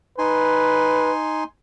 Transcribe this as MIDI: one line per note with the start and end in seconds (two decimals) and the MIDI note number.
0.18 1.44 63
0.18 1.12 71
0.18 1.44 80
0.18 1.44 84